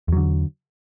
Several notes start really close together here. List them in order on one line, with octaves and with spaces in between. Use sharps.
E2 F#3 D3